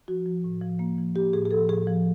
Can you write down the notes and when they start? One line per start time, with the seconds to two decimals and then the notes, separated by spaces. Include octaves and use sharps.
0.08 F3 F#4
0.26 F3
0.44 A2
0.62 F3
0.79 A#3
0.98 F3
1.15 A#3 G4
1.33 A2 G#4
1.45 G#4
1.51 F3 A4
1.69 A2 G#4
1.87 F3